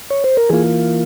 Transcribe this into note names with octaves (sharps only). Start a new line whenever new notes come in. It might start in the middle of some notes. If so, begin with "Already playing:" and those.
C#5
C5
A#4
E3 A#3 F4 G#4